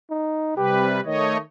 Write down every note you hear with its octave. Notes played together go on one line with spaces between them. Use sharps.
D#4
C3 G3 G4 B4
D#3 A3 C#5 D#5